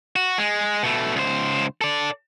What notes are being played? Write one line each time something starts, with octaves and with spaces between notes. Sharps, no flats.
F#4
G#3
B2 A3
C#2 C5
A4 D5